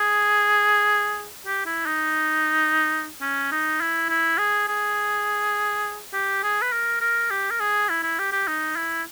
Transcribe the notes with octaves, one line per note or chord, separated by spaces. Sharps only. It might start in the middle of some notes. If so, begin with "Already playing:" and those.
Already playing: G#4
G4
E4
D#4
C#4
D#4
E4
E4
G#4
G#4
G4
G#4
B4
A#4
A#4
G4
A#4
G#4
E4
E4
G4
G4
D#4
E4